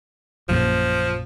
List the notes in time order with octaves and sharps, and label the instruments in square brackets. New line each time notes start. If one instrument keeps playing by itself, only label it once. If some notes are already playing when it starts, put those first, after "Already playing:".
[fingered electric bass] A#1 F#2 A#2 [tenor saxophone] F3